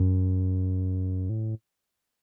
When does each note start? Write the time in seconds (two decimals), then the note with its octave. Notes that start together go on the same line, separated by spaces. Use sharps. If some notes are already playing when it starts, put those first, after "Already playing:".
Already playing: F#2
1.29 A2